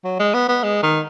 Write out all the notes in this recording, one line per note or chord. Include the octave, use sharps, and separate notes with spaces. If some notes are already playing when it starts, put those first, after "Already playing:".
F#3
G#3
B3
B3
G#3
D#3